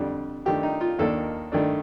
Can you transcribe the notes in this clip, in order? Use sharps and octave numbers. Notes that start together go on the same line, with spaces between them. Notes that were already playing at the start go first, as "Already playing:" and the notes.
Already playing: F2 D3 G3
G2 D#3 A3 D4 G4
D#4
F4
D#2 D#3 A#3 D4 A4
G2 D#3 A3 D4